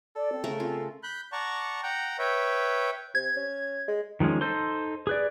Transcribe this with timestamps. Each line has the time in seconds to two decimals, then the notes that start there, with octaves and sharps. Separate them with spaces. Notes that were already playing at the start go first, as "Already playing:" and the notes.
0.16 A4 D5
0.32 C4
0.44 C#3 A3 A#4
0.60 C4 F4
1.03 B5 F#6 G6
1.32 D5 F#5 A5 A#5 C#6
1.83 F#5 G5 A#5
2.19 B4 C#5 E5 G5
3.15 C3 G#6
3.36 C#4
3.88 G#3
4.20 D#3 F3 G#3 C#4
4.41 D#4 A4 C5 C6
5.07 G#4 B4 D5